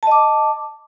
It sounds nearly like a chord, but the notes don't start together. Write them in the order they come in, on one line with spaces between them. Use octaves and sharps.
A5 D#5 D6